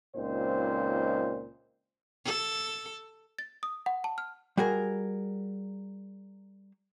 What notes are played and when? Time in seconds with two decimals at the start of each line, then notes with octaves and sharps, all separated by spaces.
0.16 C#2 A#2 C4 D#4 C5
2.25 A4
3.38 A6
3.63 D#6
3.86 F#5
4.04 A5
4.18 F6
4.57 G3 F#4 G#4 A#4